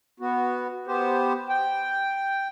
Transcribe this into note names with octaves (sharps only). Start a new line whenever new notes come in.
B3 F#4
B3 G4 C5
G5